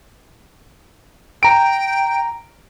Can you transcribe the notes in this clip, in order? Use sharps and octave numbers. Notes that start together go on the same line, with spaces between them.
G5 A#5 D7